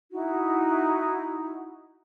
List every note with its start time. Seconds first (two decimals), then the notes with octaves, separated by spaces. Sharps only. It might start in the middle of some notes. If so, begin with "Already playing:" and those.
0.12 D#4 E4 F#4